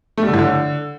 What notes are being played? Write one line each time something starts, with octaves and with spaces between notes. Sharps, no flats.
A3
G3
D3
A2
D3